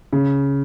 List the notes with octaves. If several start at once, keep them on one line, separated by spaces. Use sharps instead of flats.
C#3